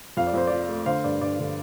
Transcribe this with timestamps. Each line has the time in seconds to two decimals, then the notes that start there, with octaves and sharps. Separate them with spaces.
0.17 F2 F5
0.27 D5
0.34 F2 C5
0.47 F3 D5
0.69 A3
0.86 D3 C5 F5
1.04 G2 D5
1.21 G2 D5
1.39 D3